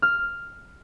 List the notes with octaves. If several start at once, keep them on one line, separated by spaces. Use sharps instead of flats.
F6